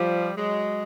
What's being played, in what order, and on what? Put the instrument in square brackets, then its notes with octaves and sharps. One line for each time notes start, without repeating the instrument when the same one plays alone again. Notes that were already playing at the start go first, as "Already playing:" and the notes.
Already playing: [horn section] F3 G3
F#3 G#3